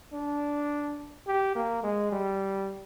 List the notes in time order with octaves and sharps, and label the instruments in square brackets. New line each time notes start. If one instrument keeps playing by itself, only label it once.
[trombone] D4
G4
A#3
G#3
G3